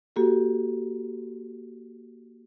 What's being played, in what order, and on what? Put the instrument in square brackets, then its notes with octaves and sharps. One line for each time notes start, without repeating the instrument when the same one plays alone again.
[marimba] A#3 F#4 G4 A4